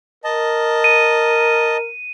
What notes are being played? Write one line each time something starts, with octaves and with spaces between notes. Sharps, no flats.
A#4 D#5 A5
D#7